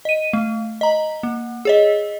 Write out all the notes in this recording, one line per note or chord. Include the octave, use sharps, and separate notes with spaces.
D#5 D#7
A3
D#5 A#5
A#3
G#4 C#5 D#5